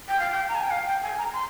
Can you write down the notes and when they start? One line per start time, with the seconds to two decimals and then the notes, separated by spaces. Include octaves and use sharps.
0.08 G5
0.19 F5
0.31 G5
0.48 A#5
0.55 G#5
0.63 G5
0.71 F5
0.87 G5
1.03 G#5
1.18 A#5
1.33 C6